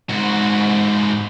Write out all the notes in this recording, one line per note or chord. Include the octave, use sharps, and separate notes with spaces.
G#2 F#4